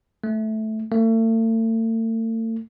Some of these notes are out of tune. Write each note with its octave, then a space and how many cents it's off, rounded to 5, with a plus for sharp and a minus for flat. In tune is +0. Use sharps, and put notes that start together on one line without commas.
A3 -10
A3 +40